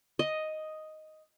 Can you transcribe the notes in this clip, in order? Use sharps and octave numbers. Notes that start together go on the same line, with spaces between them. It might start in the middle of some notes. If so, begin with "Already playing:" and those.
D#5